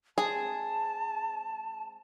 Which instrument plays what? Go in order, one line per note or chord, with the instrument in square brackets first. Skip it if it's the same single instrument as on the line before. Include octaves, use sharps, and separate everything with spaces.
[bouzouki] G#3 C4 G#5 [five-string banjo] G#4 [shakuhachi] A5